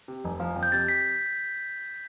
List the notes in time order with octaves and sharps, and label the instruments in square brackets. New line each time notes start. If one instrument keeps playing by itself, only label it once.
[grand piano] C3
F1
F3
F2
[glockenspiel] G6
[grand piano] C3 [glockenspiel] A6
[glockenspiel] B6